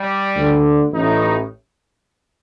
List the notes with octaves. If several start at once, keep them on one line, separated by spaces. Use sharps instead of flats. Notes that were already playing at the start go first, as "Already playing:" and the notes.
Already playing: G3
D2
D3
A1 A2 D#4